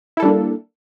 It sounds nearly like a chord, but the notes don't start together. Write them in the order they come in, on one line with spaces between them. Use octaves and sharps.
E4 A4 G3 D4 A#3